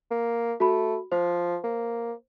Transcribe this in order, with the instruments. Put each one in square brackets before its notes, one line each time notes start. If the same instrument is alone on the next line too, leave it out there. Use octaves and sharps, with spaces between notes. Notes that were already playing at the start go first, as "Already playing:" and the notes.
[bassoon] A#3
[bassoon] A3 [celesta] F#4 B5
[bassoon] F3 [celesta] C5
[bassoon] A#3